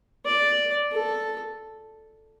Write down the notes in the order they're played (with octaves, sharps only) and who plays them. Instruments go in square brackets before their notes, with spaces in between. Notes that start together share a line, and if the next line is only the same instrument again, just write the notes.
[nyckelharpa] D5
A4